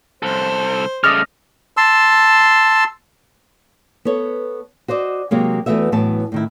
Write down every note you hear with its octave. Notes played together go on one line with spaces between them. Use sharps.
C2 A4 C5
C#3 A3 D5 D#5 D#6 F6
A5 C6 E6
B3 A4 C#5
F#4 C5 D5 D#5
C3 F#3 G#3 A#3
E2 E3 A3 B3 F#4 E5
A2 E3 F#3 B3 A5
A2 D#3 E4